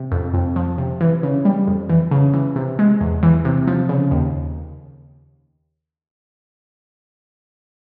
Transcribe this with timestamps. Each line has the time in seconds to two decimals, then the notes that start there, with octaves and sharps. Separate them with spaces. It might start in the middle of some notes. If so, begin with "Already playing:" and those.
Already playing: C3
0.12 F2
0.34 F2
0.56 F3
0.78 C3
1.01 E3
1.23 C#3
1.45 G3
1.67 F2
1.90 E3
2.11 C#3
2.34 E3
2.56 C3
2.79 G#3
3.01 E2
3.23 E3
3.45 C3
3.68 F3
3.89 C#3
4.11 D#2